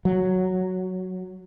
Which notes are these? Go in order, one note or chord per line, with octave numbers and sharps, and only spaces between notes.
F#3